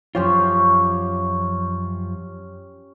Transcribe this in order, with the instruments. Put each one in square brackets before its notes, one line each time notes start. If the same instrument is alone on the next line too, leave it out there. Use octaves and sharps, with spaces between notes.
[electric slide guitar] F#2 F3 F4 [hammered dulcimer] C#4 G4 C#5